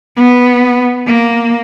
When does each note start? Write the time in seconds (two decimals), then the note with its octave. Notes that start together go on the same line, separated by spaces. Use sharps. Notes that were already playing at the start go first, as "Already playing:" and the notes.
0.16 B3
1.07 A#3